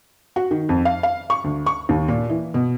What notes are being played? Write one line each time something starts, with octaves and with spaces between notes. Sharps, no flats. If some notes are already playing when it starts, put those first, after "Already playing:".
F#4
D#3
F2
F5
F5
C#6
D2
C#6
D#2
A#2
E3
B2